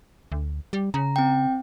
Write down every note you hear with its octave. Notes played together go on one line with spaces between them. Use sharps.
D2
G3
C#3 A#5
C4 G5